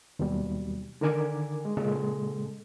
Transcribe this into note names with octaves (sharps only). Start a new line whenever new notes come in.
D#2 B2 F#3 G3
D3 D#3 A#4 G#5 D6
G#3
A#2 C#3 G#3 A4